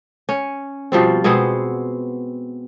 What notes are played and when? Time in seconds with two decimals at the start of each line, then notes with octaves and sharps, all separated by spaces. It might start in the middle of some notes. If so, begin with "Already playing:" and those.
0.29 C#4
0.92 B2 F3 G3 C4
1.24 B2 G#3 B3 C4